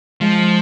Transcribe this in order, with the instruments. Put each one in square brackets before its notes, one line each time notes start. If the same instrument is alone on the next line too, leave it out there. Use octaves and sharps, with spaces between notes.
[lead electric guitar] F3 [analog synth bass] G#3